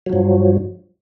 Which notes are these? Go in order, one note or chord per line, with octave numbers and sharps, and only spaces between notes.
G2 F3 F#3